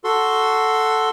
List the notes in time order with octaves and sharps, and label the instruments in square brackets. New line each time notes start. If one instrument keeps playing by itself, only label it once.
[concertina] F#4 A4 C6